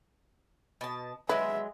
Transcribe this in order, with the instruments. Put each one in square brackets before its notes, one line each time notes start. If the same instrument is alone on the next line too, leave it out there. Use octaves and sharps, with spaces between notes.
[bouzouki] B2 A5
[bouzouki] F#3 G#3 [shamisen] B4 [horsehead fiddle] E5